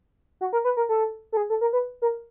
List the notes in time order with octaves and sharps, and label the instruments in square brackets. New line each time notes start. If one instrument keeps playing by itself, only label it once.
[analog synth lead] F#4
A#4
B4
A#4
A4
A4
G#4
A4
A#4
B4
A#4